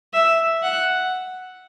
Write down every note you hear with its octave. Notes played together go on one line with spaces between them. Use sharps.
E5
F#5